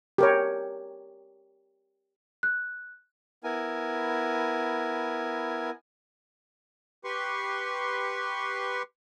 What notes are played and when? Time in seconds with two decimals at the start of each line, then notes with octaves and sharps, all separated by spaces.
0.18 G4 A#4 C#5
2.43 F#6
3.44 B3 E4 A#4 G#5
7.04 G4 B4 C6 C#6